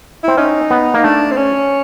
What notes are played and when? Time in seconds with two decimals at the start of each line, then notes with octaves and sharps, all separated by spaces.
0.23 C4 E4
0.37 C#4 D#4
0.71 B3
0.94 A#3
1.04 A3 D4
1.31 C4
1.36 C#4